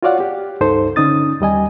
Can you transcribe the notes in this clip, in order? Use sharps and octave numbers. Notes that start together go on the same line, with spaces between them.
F4 F#4 C#5 D5 F5 F#5
G4
C#2 G2 D#4 A4 C5
D3 C#4 D#4 D#6 A6
D#2 G3 D#5 G#5